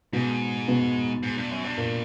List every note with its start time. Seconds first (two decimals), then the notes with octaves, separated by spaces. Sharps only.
0.13 G#2 B2 B3
0.68 B2 B3
1.23 G#2
1.37 G2
1.51 F#2
1.64 G2
1.78 A#2 A#3